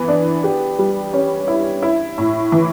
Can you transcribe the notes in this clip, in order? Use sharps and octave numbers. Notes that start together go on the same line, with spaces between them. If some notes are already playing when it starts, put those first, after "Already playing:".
Already playing: E3 B3
D4
G4
G3
C#4
E4
E4
A2
E3